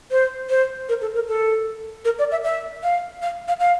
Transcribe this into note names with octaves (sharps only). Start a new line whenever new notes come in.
C5
C5
A#4
A4
A#4
A4
A#4
D5
E5
E5
F5
F5
F5
F5